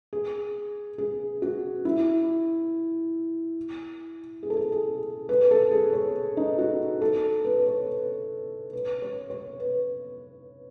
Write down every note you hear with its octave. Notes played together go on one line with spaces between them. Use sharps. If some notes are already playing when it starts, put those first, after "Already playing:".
G#4
G#4
F#4
E4
G#4
A4
G#4
G#4
B4
A4
G#4
C#5
D#4
F#4
A4
B4
C#5
B4
B4
C#5
C#5
B4